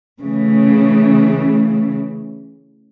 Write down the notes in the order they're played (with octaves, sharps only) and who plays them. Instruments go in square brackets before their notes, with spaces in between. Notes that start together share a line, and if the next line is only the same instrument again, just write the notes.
[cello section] C#3 E3 A3